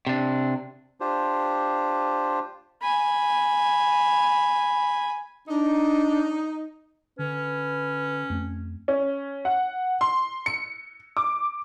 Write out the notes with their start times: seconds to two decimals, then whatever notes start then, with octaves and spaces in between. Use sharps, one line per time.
0.07 C3 D4
1.00 D4 F4 G4 C5
2.82 G#5 B5
5.48 D4 D#4
7.19 D3 C#4 B4
8.30 F2 A3
8.88 C#4
9.45 F#5
10.01 C6
10.46 C#7
11.17 D6